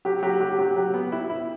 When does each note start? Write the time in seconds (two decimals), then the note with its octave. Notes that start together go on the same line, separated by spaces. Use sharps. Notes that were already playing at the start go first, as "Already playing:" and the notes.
0.05 F#3 G4
0.23 F#3 G4
0.40 F#3 G4
0.59 F#3 G4
0.76 F#3 G4
0.94 B3
1.12 E4
1.30 E4